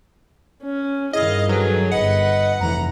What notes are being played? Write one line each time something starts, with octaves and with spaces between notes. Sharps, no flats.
C#4
G2 D#3 E4 G#4 D#5 F5
F#3 G#4 A4 B4
G1 B4 D#5 F#5
F1 E3 A#5